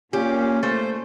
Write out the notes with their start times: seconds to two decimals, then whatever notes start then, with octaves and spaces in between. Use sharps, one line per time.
0.13 A#2 A#3 C#4 G4
0.63 A3 C5